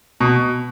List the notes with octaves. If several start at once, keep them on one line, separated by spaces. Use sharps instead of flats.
B2